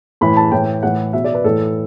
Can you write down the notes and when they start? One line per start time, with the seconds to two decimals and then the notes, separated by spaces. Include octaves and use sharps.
0.21 A2 E3 B5
0.37 A5
0.52 A2 E3 G5
0.83 A2 E3 F#5
1.13 B2 E5
1.24 D5
1.34 B4
1.44 A2 E3 A4